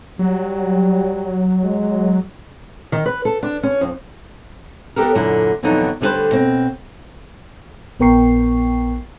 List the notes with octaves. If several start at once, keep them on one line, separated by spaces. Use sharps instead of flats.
F#3 G3
G#3
D#3
B4
A4
D4
C#4
F2
B3 D4 F4 G4 A4 A#4
F#2 A#2 D3 E4
F2 B2 D3 E3 F#3 D#4
D2 D3 G3 G#4 B4 C5
B2 C4
A#1 B3 A#4 G5 C#6 C7